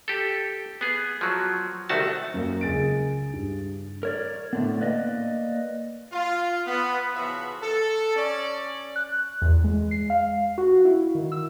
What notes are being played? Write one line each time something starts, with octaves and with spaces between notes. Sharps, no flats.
G4 A4
B3 G#4
F3 F#3
C2 D#3 A3 F#4 A5
F#2 A#3
C#2 G#4 A6 D7
G2
A#4 C#5 D5
A2 D3 B3
A#3 B4 D5 D#5
F4
B3
C#3 E3 F3 B3 F#4 E5
A4
C#4 D5
F#6
E2
G#3
C7
F5
F#4
E4
D#3
E6